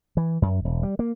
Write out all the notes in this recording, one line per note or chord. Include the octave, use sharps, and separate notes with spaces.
E3
F#2
E1
G3
A#3